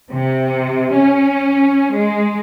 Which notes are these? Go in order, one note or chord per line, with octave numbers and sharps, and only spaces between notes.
C3
C#4
G#3